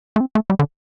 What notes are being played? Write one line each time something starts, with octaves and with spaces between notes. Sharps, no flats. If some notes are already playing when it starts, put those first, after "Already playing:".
A3
C4
A3
G3
D3